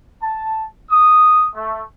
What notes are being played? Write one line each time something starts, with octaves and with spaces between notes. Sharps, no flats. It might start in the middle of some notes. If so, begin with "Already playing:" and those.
A5
D#6
A3